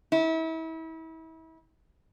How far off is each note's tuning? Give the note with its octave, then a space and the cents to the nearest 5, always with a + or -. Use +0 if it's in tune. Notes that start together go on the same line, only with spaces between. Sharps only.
E4 -35